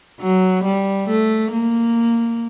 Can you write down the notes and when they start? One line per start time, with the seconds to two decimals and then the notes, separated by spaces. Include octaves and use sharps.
0.21 F#3
0.64 G3
1.09 A3
1.52 A#3